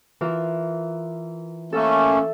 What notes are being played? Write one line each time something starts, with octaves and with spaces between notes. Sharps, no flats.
E3 F4 A#4
A3 A#3 C#4 A4 E5